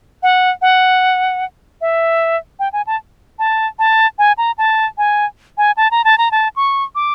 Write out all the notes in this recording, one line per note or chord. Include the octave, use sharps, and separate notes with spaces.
F#5
F#5
E5
G5
G#5
A5
A5
A5
G#5
A#5
A5
G#5
G#5
A5
A#5
A5
A#5
A5
C#6
D6